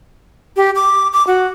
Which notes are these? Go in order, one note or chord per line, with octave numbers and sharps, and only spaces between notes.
G4
D6
D6
F#4